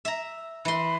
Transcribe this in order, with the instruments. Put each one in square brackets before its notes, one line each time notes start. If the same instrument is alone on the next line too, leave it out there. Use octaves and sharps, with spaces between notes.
[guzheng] E5 A#5
[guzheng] E3 C6 [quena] B5